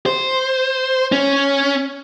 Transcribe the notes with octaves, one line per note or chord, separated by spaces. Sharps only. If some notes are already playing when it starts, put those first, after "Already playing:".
C5
C#4